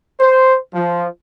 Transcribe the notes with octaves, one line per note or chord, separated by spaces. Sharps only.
C5
F3